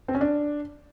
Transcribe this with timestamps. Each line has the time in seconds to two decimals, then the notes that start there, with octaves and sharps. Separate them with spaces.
0.08 C4
0.15 C#4
0.21 D4